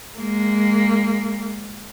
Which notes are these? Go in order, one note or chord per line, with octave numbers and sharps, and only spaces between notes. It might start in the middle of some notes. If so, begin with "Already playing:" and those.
G#3 A#3